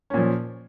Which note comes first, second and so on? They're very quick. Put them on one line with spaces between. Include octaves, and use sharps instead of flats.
C#4 A#2 F3